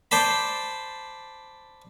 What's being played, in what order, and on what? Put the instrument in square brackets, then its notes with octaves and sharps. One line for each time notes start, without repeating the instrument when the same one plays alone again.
[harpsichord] C5 D5 A5 B5